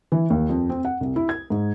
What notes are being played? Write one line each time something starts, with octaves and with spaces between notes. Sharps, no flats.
E3
D#2
F2
C4
F#5
C2
E4
G#6
G#2